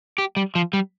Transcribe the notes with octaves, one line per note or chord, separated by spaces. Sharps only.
G4
G3
F3
G3